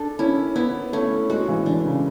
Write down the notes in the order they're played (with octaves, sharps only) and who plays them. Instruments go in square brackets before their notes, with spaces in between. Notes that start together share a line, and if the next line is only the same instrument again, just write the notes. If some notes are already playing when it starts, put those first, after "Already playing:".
Already playing: [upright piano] D4 [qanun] A4
[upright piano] C#4 [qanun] E4
[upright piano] B3 [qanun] E4
[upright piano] A3 [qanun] C#4
[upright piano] G#3 [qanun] F#4
[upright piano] E3
[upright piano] D3 [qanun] D4
[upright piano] C#3